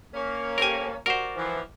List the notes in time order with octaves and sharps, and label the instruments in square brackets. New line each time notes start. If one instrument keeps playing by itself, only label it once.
[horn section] A#3 C#4
[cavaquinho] G4 A4 C5 [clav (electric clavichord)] A#4 G#5
[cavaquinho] F#4 D5 [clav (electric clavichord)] A#4 C5
[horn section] E3 F3